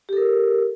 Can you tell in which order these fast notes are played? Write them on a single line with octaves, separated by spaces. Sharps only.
G4 A4 A#4